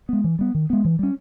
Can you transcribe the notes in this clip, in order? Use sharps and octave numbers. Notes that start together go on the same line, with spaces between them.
G#3 B3
E3
G3 B3
D#3
G#3 B3
E3
G3 C#4